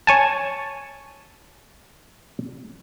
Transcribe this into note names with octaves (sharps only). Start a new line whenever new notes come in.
C#5 G#5 A5